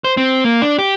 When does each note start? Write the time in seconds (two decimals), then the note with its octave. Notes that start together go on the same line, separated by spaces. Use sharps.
0.04 C5
0.17 C4
0.44 A#3
0.62 D4
0.78 G4